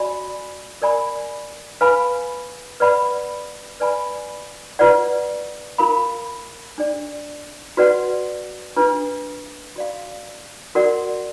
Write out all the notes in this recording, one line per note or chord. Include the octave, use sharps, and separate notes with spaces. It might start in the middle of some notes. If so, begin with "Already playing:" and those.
Already playing: F#4 D5 G#5 B5
A#4 D5 G#5 B5
B4 F5 G#5 B5
B4 D5 F#5 B5
B4 D5 G#5 B5
F4 B4 D5 F#5
F4 A#4 F5 B5
D4 G#4 D5
F#4 B4 D5 F#5
D4 F4 B4
F#4 D5 F5
F#4 A#4 D5 F#5